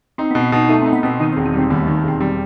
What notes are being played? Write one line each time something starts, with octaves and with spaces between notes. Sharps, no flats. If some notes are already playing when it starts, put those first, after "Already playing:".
C4 D#4
B3
B2
B3
B2 D#4
A3 D#4
C4 D#4
B3
B2 C4
D#3 D#4
E1 C4
D#4
G3 C4
D#2 B3
D#3 A3
E1 C4
G3 C4